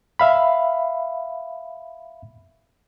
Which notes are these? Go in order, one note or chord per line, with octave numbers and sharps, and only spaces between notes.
E5 F5 B5